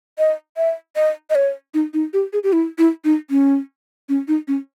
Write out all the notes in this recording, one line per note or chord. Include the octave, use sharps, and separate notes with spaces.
D#5
E5
D#5
D#5
C#5
D#4
D#4
G4
G#4
G4
E4
E4
D#4
C#4
C#4
D#4
C#4